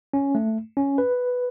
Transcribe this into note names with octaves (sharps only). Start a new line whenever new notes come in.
C#4
A3
C#4
B4